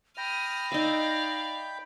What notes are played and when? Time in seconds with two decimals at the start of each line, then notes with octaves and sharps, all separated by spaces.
0.18 G5 B5 D#6 F6 G6 A#6
0.72 D#4 D5 E5 F5